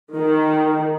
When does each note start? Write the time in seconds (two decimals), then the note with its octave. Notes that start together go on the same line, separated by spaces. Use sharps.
0.17 D#3